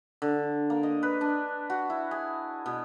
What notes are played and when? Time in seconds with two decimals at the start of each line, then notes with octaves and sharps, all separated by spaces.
0.22 D3
0.70 A#3
0.83 D#5
1.03 B4
1.21 D4
1.70 F#4
1.90 E4
2.11 G#4
2.66 B2